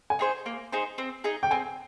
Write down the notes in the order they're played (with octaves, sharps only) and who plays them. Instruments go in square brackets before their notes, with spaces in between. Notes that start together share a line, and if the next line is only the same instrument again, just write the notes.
[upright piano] G#5
[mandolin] D#4 G#4 C5
A#3
D#4 G#4 C5
C4
D#4 G#4 D#5
[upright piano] G5
[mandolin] C4 [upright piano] G#5